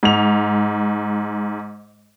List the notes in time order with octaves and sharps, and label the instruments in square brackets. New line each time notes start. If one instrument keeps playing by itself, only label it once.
[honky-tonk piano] G#2 F7